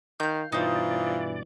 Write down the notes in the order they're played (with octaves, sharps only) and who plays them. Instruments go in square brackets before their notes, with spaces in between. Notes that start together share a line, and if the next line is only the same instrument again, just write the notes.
[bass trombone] D#3 [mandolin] F5 G6
[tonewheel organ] G2 B2 D5 [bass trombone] E3 [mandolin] D#4 C5 [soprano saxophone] F4